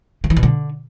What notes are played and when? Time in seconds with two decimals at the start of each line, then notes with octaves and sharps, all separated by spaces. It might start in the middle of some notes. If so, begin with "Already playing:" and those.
0.24 C#3
0.30 E3
0.37 B2
0.43 D3